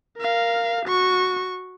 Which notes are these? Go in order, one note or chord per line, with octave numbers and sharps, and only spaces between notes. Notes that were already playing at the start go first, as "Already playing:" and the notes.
A#4 F5
F#4 C#6